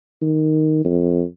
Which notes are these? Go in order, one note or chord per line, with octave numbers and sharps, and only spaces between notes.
D#3
F2